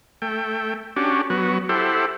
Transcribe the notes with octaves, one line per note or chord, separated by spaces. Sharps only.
A3 G5
C#4 D4 F#4 G4
F#3 B3 F#4
E4 G4 A4 C5 F#5